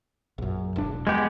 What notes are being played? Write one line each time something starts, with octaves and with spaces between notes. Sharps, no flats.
A#1 F#2
E1 D4
G#3 B3 G4